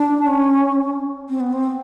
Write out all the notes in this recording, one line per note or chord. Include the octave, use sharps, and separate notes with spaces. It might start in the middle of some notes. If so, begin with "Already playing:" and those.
Already playing: D4
C#4
C4
B3
C4